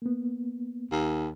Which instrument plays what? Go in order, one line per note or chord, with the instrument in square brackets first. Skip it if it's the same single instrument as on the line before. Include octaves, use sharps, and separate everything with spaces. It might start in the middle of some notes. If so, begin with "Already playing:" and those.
[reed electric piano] A#3 B3
[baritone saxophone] D#2